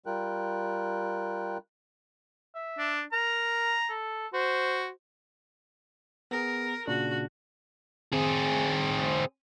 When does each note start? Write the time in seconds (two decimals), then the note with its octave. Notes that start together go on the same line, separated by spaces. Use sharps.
0.06 G3 F4 A#4 G5 F#6
2.55 E5
2.78 D4
3.13 A#4 A#5
3.89 A4
4.33 F#4 C5
6.31 B3 G#4 A#4
6.87 A#2 C#3 D4 F#4
8.12 C4 G#4